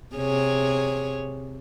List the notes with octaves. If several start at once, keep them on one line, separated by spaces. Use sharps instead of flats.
C3 G#4 C#5